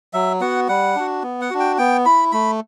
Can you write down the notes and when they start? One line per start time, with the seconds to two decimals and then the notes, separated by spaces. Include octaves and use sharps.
0.13 F#3 E5
0.40 B3 F#4 F#5
0.68 G3 F#5
0.96 D4 F#4
1.23 B3
1.41 F#5
1.50 D4 F#4
1.60 G5
1.78 B3 G5
2.05 E4 B5
2.32 A3 B5